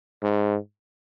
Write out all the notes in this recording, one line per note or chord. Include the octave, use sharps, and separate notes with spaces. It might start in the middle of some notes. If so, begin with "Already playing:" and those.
G#2